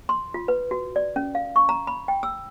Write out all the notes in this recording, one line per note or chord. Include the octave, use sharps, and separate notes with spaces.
C6
F4
B4
F#4
D5
C#4
F5
C#6
A#5
B5
G5
E6